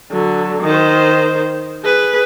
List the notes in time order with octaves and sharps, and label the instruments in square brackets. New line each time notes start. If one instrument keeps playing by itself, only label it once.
[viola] D3 F#3
D#3 C5
G#4 B4